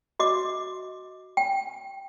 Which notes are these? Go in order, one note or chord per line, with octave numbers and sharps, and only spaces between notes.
F#4 D#5 D6
G5